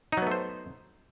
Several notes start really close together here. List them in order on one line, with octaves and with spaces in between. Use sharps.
D#4 F#3 B3 A3 C5